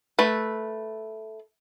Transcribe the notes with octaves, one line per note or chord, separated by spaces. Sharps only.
A3 B4